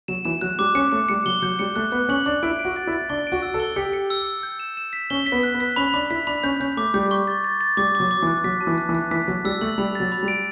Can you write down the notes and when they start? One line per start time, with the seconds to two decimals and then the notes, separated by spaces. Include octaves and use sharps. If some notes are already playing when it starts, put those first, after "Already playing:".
0.08 F#3 E7
0.25 E3 E7
0.41 F#3 F#6
0.59 G3 D6
0.75 C#4 C#7
0.92 A3 C#7
1.09 G3 C#7
1.26 F#3 G7
1.42 F#3 G6
1.59 G3 C#7
1.76 A3 F#6
1.92 B3 F#6
2.09 C#4 F#7
2.26 D4 F#6
2.43 E4 D7
2.59 D7
2.65 F#4
2.76 A6
2.87 E4
2.93 A6
3.09 D4 G7
3.27 D7
3.32 F#4
3.42 E6
3.54 A4
3.60 G7
3.76 G4 C#7
3.93 C#7
4.10 E6
4.27 E6
4.43 G6
4.60 E7
4.77 E7
4.93 B6
5.10 C#4 G7
5.26 B6
5.32 B3
5.43 F#6
5.55 B3
5.60 B6
5.76 C#4 B5
5.94 D4 B5
6.10 E4 B6
6.27 D4 B5
6.44 C#4 G6
6.60 C#4 G6
6.77 A3 D6
6.94 G3 G6
7.11 C#6
7.27 A6
7.44 A6
7.61 A6
7.77 G3 D6
7.95 F#3 D6
8.11 D6
8.22 E3
8.27 F#6
8.44 F#3 B6
8.61 A5
8.67 E3
8.78 F#6
8.89 E3
8.95 F#6
9.11 E3 B6
9.28 F#3 B6
9.45 G3 E6
9.61 A3 F#7
9.78 G3 B5
9.95 F#3 A6
10.12 B5
10.23 G3
10.28 D7